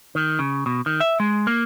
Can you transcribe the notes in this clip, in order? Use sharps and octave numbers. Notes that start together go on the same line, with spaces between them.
D#3
C#3
B2
D#3
E5
G#3
A#3